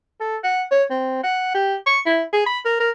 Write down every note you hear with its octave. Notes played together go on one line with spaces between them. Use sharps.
A4
F#5
C#5
C4
F#5
G4
C#6
E4
G#4
B5
A#4
A#4